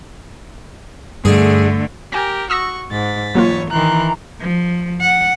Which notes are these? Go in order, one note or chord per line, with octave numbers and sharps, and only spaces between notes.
G2 D3 A3 G#4
G4 A#4 G#5 A#6
F#4 C#6 D#6 E6 A#6
G#2 A6 B6
E3 F#3 A3 A#3 F4 C#5
D#3 E3 A#5 C6 F#6
F3
F#5